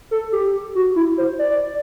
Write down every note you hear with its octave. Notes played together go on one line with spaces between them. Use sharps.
A4
G4
F#4
E4
C5
D5